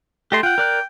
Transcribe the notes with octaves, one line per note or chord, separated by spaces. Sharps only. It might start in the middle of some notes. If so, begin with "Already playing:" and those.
A3 G4 D#5 C6
F4 F#5 G5
A#4 D5 F#6